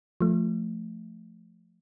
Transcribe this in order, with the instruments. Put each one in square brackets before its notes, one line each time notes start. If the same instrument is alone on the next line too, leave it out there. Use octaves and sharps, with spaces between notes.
[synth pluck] F3 A3